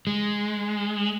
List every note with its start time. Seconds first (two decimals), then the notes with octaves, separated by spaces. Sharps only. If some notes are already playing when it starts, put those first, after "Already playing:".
0.07 G#3